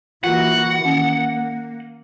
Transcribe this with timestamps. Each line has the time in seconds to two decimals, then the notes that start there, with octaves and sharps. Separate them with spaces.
0.24 E3 A#3 F4 F#4 F#5
0.81 D#3 A#3 C#4